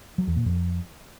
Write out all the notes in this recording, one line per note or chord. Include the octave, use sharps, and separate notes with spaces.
F#3
E2
A#2
F2